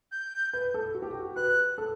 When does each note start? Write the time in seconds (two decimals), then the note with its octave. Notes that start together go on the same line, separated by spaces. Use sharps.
0.12 G6
0.53 B4
0.74 A4
0.95 F#4
1.02 G4
1.11 F#4
1.36 B4 F#6
1.78 A4